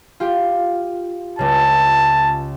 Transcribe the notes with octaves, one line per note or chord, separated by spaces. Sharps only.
F4 G4
C#2 C#3 A5